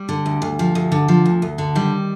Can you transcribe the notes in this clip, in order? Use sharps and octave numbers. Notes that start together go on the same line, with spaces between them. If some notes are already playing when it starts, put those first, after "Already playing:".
Already playing: G3
D3
D2
D2
F3
D2
D3
F3
D2
D2
D3
D#3 G3